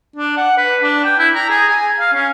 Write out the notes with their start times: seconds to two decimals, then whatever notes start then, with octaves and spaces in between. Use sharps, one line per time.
0.16 D4
0.37 F#5
0.58 B4
0.83 D4
1.05 G5
1.19 E4
1.35 A#5
1.50 G#4
1.69 G#5
2.00 F5
2.14 C#4